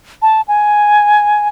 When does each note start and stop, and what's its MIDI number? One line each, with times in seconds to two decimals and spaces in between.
0.22 0.41 81
0.48 1.48 80